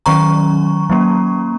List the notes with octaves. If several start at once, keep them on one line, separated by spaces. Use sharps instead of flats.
D#3 F#3 C#4 A#5 C#6
F#3 A#3 C#4